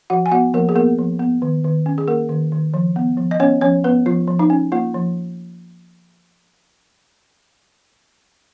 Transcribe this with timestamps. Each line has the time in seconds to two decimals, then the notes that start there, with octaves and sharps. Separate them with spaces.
0.10 F3 F#4 F#5
0.26 G#5
0.31 B3 F#4 F#5
0.54 F3 A#3 A#4
0.69 G#4
0.76 A#3 B3 A#4
0.98 F3
1.20 B3
1.42 D#3
1.64 D#3
1.86 C#4
1.98 G#4
2.08 A#3 A#4
2.29 D#3
2.52 D#3
2.74 F3
2.96 B3
3.17 F3
3.31 D#5
3.40 B3 C#4 C#5
3.61 F3 C#4 C#5
3.84 B3 B4
4.06 F3 F4
4.28 F3
4.39 D#4
4.50 C#4
4.72 A#3 F4
4.94 F3